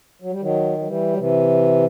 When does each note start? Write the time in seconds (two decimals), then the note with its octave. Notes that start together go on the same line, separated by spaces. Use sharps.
0.22 F#3
0.31 G3
0.41 D#3 F#3
0.78 F#3
0.86 E3 G3
1.13 F#3
1.18 C3 E3